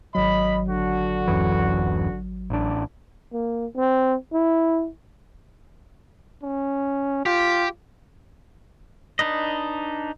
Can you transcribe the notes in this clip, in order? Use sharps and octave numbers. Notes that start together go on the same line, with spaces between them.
G#1 F#3 D#5 B5
D3 F#4
D1 F#2 E3
A1 D4
A#3
C4
E4
C#4
F4 G4
D4 D#4 B4 D#5